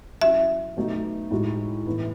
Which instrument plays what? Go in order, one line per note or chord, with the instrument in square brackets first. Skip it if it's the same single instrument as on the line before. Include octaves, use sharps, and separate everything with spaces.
[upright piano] F#3 C#4 E4 [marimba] E5
[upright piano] B2 F#3 A3 D#4
A2 G#3 D#4 F#4
A2 E3 B3